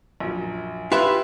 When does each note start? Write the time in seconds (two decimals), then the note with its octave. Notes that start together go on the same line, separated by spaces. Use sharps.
0.20 A#1 F#2
0.92 E4 F4 G4 B4 E5 F#5